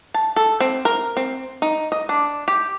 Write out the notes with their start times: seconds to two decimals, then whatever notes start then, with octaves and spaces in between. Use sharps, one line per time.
0.14 A5
0.36 A4
0.60 C4
0.85 A#4
1.17 C4
1.62 D#4
1.92 D#5
2.09 D4
2.48 G4